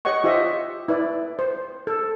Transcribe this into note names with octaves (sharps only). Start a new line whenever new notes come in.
G4 C#5 D#5 F#5 C#6
F4 G4 C5 D#5 E5
E4 B4 D5
C5
A4